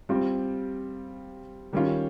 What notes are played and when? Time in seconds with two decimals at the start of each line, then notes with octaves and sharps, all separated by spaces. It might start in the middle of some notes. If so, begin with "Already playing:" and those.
0.09 G3 C4 F4
1.73 D#3 G3 C#4 F4